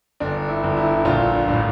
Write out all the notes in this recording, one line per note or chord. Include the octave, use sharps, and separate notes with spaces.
G1 D4
E4
G1
E4
A#1 F4
A2 D4